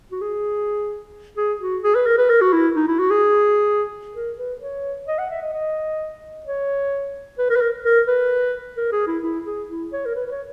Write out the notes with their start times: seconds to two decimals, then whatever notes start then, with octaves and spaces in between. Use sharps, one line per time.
0.12 F#4
0.21 G#4
1.37 G#4
1.61 F#4
1.83 G#4
1.95 B4
2.06 A#4
2.18 B4
2.29 A#4
2.41 F#4
2.53 E4
2.76 D#4
2.88 E4
2.99 F#4
3.10 G#4
4.15 A#4
4.38 B4
4.61 C#5
5.07 D#5
5.18 F#5
5.30 E5
5.42 D#5
5.53 D#5
6.46 C#5
7.38 B4
7.50 A#4
7.56 B4
7.61 A#4
7.84 A#4
8.07 B4
8.77 A#4
8.92 G#4
9.07 E4
9.23 E4
9.46 G#4
9.69 E4
9.93 C#5
10.06 A#4
10.15 B4
10.27 B4
10.31 C#5